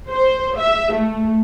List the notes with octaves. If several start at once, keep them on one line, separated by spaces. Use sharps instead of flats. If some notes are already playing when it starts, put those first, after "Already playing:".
C5
E5
A3